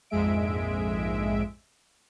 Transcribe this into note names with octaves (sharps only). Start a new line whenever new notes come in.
A#1 F2 G#2 G#3 E5 D7